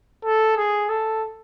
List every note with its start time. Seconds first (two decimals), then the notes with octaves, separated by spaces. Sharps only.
0.25 A4
0.57 G#4
0.89 A4